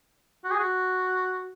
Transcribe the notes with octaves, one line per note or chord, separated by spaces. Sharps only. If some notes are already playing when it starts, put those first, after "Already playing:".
F#4
G#4
F#4